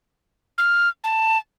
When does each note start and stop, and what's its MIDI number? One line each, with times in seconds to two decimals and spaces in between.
0.58 0.89 89
1.04 1.38 81